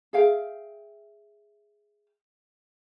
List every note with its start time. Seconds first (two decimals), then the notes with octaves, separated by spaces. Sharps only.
0.13 G#4 E5 F5 G5